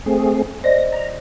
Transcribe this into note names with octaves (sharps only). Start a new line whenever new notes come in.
A3 C4 G#4
C5 D5 D#5 A#6
A#5